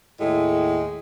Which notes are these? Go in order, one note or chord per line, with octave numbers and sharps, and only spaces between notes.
D#2 A2 G#3